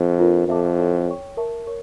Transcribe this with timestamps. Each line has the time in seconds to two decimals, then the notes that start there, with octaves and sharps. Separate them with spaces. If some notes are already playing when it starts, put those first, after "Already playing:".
Already playing: F2
0.19 D4 F4 A#4
0.48 F2 A4 E5 A5 D6
0.78 E4 A4 C#5 E5 G5
1.07 C#5 G5 C#6
1.37 A#4 E5 A5 C#6
1.67 A#4 C#5 C#6